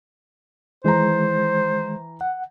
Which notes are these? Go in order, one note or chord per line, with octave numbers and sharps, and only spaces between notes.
D#3 E3 G#3 C5 A#5
F#5